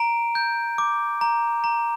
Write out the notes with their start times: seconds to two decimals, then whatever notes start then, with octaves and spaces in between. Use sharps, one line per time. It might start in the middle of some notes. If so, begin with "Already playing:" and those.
Already playing: A#5 D7
0.35 G6
0.78 D6
1.21 A#5
1.64 A#5